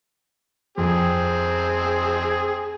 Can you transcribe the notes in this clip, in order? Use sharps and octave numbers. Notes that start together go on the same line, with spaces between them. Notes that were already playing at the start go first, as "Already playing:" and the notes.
F2 C4 G#4